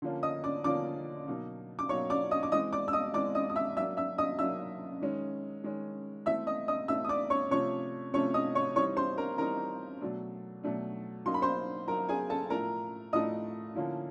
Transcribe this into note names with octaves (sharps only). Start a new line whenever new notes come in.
D3 F3 A#3 C#4
D#5 D#6
D5 D6
D3 F3 A#3 C#4 D5 D6
B2 F#3 A#3 D#4
D6
B2 F#3 A#3 D#4 C#5 C#6
D5 D6
D#5 D#6
D6
E3 G#3 C4 D#5 D#6
D5 D6
E6
D#5 D#6
E3 G#3 C4 D5 D6
D#5 D#6
D#6
E5 E6
F#3 A#3 D4 E5 E6
E5 E6
D#5 D#6
F#3 A#3 D4 E5 E6
D#3 G#3 C#4
D#3 G#3 C#4
E3 A3 C4 E5 E6
D#5 D#6
D#5 D#6
E3 A3 C4 E5 E6
D#6
D5 D6
C#5 C#6
C3 F3 A3 C#4 C#5 C#6
C3 F3 A3 C#4 C#5 C#6
D#5 D#6
C#5 C#6
E3 G3 C4 D#4 C#5 C#6
C5 C6
A#4 A#5
E3 G3 C4 D#4 A#4 A#5
B2 F#3 A3 D4
B2 F#3 A3 D4
F#3 A#3 D#4 C6
B5
C5 C6
F#3 A#3 D#4 A#4 A#5
G#4 G#5
A4 A5
A2 F3 A3 D4 A#4 A#5
A2 F3 A3 D4 D#5 D#6
D3 F3 A#3 C#4 E4